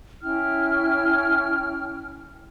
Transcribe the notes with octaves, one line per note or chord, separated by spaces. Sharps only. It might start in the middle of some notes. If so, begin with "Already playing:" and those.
C#4 E4 G5 F6